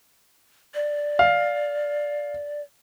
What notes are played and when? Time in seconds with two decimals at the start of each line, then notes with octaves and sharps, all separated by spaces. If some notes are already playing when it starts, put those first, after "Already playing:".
0.74 D5
1.19 F5